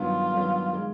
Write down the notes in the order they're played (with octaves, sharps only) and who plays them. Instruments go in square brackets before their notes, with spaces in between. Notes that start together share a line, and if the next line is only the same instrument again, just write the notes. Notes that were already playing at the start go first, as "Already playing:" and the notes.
Already playing: [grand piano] G2 D#3 F#3 B3 [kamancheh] F4
[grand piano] G2 D#3 F#3 B3
D#3 G#3